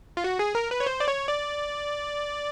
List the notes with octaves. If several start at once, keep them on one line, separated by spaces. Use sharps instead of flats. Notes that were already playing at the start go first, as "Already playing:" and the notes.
F4
F#4
G#4
A#4
B4
C#5
C5
D5
C#5
D5